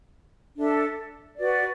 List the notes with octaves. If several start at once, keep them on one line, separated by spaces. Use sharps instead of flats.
D4 A4 E5
F#4 B4 D5